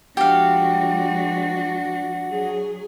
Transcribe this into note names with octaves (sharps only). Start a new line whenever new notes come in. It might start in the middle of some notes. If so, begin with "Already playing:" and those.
F3 G#3 D4 F#4 G4 F5 F#5
F#3 G#4